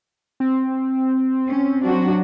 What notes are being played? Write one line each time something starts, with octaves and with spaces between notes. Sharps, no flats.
C4
C#4
F#3 D4 F#4